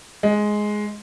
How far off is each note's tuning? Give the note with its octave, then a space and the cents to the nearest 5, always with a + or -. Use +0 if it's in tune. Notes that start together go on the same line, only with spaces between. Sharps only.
G#3 +10